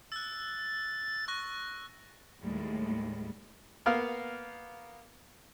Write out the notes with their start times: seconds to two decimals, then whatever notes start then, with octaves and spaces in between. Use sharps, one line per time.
0.12 E6 F#6 A6
1.28 C#6 F#6 A#6
2.40 D#2 A2 G3 G#3
3.86 A#3 B3 F5